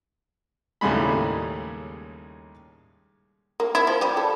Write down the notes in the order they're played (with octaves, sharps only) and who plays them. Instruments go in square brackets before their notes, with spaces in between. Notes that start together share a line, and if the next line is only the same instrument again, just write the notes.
[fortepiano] D#2 A2 C#3 G3 G#3 B5
[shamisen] A#3
E4
F3
G3
A4